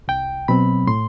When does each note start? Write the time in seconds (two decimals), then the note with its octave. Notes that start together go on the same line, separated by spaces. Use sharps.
0.08 C2 G5
0.48 B2 F#3 C4 B5
0.87 A2 C6